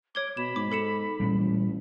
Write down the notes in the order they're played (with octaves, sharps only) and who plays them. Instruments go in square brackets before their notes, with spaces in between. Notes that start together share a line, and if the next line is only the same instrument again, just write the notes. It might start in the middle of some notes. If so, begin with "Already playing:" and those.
[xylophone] C#5 G#6 G7 [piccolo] D6
[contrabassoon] B2 [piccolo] B5 [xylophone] E7
[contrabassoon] G#2 [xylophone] D6
[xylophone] A4 C#7 E7
[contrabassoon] A1 [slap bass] A#2 G3
[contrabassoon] A1